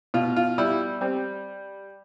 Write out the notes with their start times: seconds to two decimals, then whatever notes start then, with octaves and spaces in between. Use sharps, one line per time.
0.14 B2 F4
0.36 F4
0.58 G3 E4
1.01 G3 C4